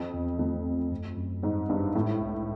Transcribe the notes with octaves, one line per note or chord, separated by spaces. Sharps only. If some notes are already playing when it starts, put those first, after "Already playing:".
Already playing: F2 C4
E2
F2 A3
G#1
F#2
F#2
G#2 G3
G#1 G2
A2 G#3
C2